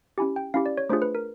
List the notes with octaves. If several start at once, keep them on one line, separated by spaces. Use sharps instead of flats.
C#4 E4 G4 G#5
G5
C#4 E4 G4 F5
D5
C#5
A3 D4 F4 G#4 C5
B4
A#4